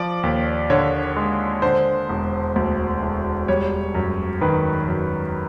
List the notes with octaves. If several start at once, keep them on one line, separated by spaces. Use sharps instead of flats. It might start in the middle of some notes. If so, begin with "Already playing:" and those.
Already playing: F3 D5
D#2
D3 C#5
G#3
D3 C5
E1
D2
E1
G3 C#5
F#2
D#3 B4
F#2